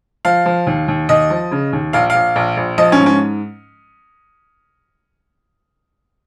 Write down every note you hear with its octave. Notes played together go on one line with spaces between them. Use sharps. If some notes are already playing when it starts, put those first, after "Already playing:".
F3 F5
F3
D#2
D#2
D#2 D#5
F3
C#3
D#2
A#1 F5
F5
A#1
A#1
A#1
F3 D#5
C#4
G#2
C#4